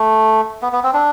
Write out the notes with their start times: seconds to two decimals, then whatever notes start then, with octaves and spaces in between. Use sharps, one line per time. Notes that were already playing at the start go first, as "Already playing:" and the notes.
Already playing: A3
0.62 B3
0.73 B3
0.83 C4
0.94 D4